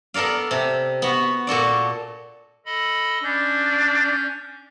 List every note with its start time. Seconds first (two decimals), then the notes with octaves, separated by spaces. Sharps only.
0.14 B3 A4 A#4 D5 F5
0.51 C3
1.02 B3 F#4
1.47 A#2 F#4 A4 D5
2.66 A4 D#5 B5
3.23 C#4 D4 G6